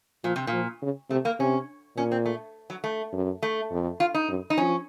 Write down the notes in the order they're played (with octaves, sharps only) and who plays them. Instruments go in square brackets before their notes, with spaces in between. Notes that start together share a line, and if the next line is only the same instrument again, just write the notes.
[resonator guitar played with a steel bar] A#2 [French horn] F3
[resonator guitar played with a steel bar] C3
A#2
[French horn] F3
C#3
[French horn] C3 [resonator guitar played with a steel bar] A3
[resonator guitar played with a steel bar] A#3
[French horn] C3 [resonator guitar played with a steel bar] C#4
[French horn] A#2 [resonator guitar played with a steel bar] C#4
[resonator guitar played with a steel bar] C4
A3
F#3
A3
[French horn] F#2
[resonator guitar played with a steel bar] A3
[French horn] F2
[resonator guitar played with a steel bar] F4
D#4
[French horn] F#2
[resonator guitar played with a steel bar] D#4
[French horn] F3 [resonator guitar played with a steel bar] C#4